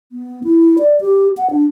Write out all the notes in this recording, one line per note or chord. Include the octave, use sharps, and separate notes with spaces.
B3
E4
D5
G4
F#5
D4